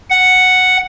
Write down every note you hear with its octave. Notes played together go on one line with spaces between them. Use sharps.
F#5